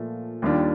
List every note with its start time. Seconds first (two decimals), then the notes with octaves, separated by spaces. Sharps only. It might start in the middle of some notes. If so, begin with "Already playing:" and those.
Already playing: A#2 F3 A3
0.42 D#2 D#3 G3 D4 F4